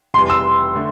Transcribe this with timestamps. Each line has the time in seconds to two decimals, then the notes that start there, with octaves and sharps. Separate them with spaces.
0.14 F1 F2 E3 G3 C6
0.30 E6
0.75 D3 A3